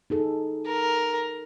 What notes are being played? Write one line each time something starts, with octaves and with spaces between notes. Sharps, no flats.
D#4 G#4 A4
A#4